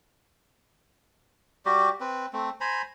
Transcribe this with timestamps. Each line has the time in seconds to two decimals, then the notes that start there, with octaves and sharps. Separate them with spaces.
1.66 G3 F#4 G4
2.00 C4 B4
2.33 A3 C4
2.61 C5 G#5 A#5 B5